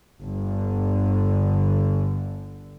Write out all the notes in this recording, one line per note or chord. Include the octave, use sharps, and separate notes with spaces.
G1 D3